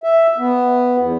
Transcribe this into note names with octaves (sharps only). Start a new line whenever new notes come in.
E5
B3
E2